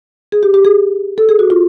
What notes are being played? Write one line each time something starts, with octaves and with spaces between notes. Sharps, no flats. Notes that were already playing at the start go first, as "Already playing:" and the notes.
G#4
G4
G4
G#4
A4
G#4
F#4
F4